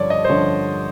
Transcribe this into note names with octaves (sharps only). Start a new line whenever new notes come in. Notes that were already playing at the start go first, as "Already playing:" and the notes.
Already playing: G2 D3 F3 C#5 D5
D#5
C5
G2 D3 F3 C#5